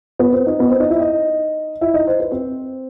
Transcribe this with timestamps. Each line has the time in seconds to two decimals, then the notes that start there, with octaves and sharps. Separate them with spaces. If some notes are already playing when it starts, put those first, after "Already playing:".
0.19 B3 B4
0.32 C4 C5
0.47 D#4 D#5
0.59 B3 B4
0.69 C4 C5
0.80 D#4 D#5
0.90 E4 E5
1.00 D#4 D#5
1.81 E4 E5
1.94 D#4 D#5
2.07 C5
2.20 B4
2.31 C4 C5